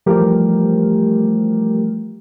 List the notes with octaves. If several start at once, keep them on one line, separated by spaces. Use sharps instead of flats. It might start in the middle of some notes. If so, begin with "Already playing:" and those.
E3 F3 G3 A3 G4 A#4